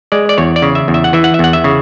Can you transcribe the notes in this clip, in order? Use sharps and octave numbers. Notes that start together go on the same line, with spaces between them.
G#3 D5
D5
E2 C#5
D5
C#3
E5
E2
E5
F#5
E3 E5
F#5
E5
E2 F#5
E5
C#3